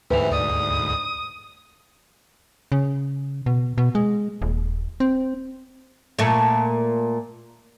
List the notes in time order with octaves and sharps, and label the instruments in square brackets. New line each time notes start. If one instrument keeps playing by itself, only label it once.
[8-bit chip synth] D2 G#2 [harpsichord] C3 E3 [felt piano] B4
[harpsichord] D5 [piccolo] D#6
[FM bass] C#3
B2
B2
G#3
D#1
C4
[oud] A#2 A3